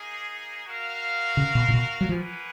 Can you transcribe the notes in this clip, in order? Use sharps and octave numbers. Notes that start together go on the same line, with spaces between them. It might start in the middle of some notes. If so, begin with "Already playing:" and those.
Already playing: A#3 D#4 G#4
F#4 A#4 F5
C#3
B2
A#2
B2
F#3
F3 A#3 C#4 G#4 B4 F#5